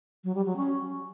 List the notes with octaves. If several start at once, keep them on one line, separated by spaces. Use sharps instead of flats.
F#3
G3
F#3
C#4